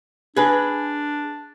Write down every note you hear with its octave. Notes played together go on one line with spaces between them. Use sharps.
D4 G#4 B4